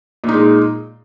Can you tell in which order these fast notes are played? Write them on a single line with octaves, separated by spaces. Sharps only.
A#2 D#4 G#3